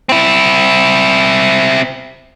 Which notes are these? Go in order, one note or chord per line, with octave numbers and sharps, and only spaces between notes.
C4 E4